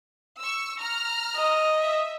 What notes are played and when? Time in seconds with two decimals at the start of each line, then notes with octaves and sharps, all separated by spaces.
0.42 C#6 E6
0.81 A#5 F6
1.36 D#5
1.81 E5